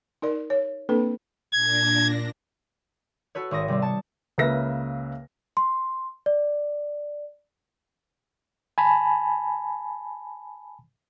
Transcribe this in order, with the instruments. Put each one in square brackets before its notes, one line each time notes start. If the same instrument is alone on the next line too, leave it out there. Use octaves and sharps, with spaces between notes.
[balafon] D#4 A#4 D5
C#5
A#3 C4 D4 A4 B4
[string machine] A#2 D4 A#6 [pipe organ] G#6
[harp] F#4 A4 B4 C#5
G#1 C#6 D#6 A#6
C3 G3 B3 C4
C#5 A5
[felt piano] C#2 C#3 A#3 B4 E5 A#6
[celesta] C6
D5
[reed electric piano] G#5 A5 B5